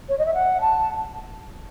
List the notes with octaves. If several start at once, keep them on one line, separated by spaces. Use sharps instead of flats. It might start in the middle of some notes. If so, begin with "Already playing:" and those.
C#5
D#5
E5
F#5
A5